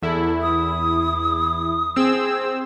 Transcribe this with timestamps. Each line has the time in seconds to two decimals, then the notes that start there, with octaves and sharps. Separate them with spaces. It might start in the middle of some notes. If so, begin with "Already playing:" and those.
0.02 E2 E4 A4
0.42 D#6
1.96 C4 G#4 E6